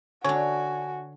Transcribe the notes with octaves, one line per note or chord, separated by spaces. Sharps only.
D3 D4 F#4 C#5 G#5